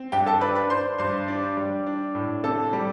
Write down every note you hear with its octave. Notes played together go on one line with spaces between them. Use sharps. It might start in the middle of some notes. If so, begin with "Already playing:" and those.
Already playing: C4
G2 G4 G5
A4 A5
D4 B4 B5
B4 B5
D4 C5 C6
G2 C5 C6
D4
G3
D4
A2
C3 A4 A5
G3